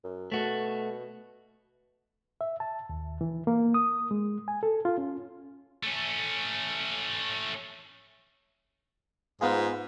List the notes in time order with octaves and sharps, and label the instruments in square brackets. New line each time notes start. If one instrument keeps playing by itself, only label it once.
[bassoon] F#2
[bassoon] B2 [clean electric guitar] A3 F#4
[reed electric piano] E5
A5
D#2
E3
A#3
D#6
G#3
G#5
A4
F4
C#4
[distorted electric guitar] A3 C#4
[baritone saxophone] G#2 [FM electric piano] B3 F4 G#4